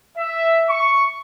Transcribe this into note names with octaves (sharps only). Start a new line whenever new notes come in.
E5
C#6